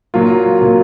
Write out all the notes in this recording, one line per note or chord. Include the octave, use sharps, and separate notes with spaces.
A#2 F#3 A#3 F4
A#2 F#3 A#3 F4